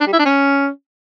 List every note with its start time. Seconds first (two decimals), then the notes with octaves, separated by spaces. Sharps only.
0.01 D4
0.07 G3
0.13 E4
0.19 D4
0.25 C#4